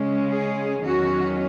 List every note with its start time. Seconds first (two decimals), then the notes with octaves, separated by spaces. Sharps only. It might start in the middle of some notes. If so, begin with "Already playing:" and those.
Already playing: C#3 G#3 C#4
0.31 G#4
0.85 E2 D#3 F#3 C#4 F#4